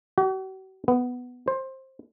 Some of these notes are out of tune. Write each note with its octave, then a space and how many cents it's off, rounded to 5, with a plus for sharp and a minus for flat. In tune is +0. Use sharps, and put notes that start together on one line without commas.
F#4 +45
B3 +5
C5 +15